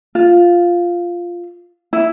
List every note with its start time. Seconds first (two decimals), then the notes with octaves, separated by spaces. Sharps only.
0.15 F4
1.93 E4